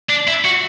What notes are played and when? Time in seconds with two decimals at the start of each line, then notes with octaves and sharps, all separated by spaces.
0.09 D4
0.27 E4
0.45 F#4